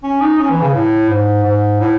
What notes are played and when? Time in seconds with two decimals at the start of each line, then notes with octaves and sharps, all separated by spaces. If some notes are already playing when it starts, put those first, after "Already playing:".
0.03 C#4
0.21 D#4
0.39 C#4
0.50 E3
0.62 C#3
0.74 A2
1.09 G#2
1.44 G#2
1.80 A2